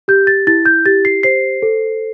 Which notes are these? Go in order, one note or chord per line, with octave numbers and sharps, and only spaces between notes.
G4 G6
A6
E4 A6
G6
G4 A6
C7
C5 C7
A4